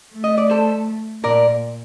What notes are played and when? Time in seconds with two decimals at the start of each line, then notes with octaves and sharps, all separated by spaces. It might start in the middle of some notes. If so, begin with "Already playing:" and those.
0.14 A3
0.24 D#5
0.38 D5
0.49 A4 C5
1.23 A#2 A#4 D5